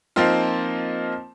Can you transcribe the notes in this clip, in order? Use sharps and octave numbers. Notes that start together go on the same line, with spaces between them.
F3 A#3 C4 D#4 F4